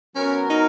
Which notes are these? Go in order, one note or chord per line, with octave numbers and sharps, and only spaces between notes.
F#3 B3 C#4 F#4 A#4
D#4